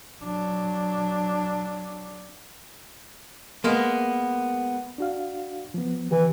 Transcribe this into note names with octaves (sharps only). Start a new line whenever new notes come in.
F#3 D4
G#3 A#3 B3
D4 F#4 F5
F3 B3
C3 D#3 E3 G4